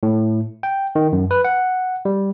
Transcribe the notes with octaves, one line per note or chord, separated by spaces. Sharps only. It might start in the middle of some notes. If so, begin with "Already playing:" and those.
A2
G5
D#3
F#2
B4
F#5
G3